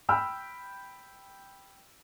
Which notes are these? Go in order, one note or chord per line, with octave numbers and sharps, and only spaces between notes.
G5 B5 E6 F6